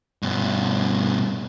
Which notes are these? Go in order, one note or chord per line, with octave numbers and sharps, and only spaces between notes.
G2 B2